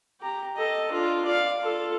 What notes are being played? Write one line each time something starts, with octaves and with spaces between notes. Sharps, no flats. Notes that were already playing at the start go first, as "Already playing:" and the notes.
G4 A#5
A4 D#5
D4 F4
D5 F5
F4 A4